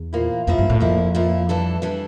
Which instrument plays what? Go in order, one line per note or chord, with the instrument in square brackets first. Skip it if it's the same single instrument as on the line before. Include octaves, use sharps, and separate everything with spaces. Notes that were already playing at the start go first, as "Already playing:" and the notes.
Already playing: [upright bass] E2
[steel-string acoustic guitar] A#2 F3 A#3 E4
[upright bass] F2 [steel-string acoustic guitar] A#2 F3 A#3 E4
[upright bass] G2
A2
[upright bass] F2 [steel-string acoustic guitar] A#2 F3 A#3 E4
[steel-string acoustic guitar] A#2 F3 A#3 E4
E3 G3 D4 A4
E3 G3 D4 A4